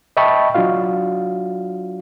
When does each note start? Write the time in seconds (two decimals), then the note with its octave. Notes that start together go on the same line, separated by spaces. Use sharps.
0.17 D#5 E5 G5 A5 B5 C#6
0.54 F#3 D4 F4 F#4 F5